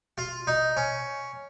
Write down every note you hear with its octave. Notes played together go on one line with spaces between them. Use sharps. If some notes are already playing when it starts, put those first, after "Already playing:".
F4
D#4
C#4